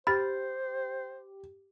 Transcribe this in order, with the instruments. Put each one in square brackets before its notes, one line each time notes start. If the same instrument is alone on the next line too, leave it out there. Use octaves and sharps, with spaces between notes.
[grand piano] G4 [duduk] C5 [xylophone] B5 F6 A6